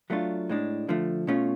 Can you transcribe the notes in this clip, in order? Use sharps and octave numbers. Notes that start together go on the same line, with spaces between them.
F#3 A3 D4 F4
A2 G#3 D4
D3 F3 A3
B2 A3 C#4 F4